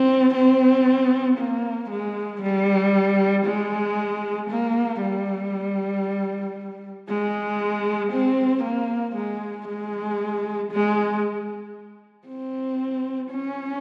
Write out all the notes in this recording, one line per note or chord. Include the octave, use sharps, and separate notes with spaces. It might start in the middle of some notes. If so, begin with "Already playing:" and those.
Already playing: C4
C4
A#3
G#3
G3
G#3
A#3
G3
G#3
C4
A#3
G#3
G#3
G#3
C4
C#4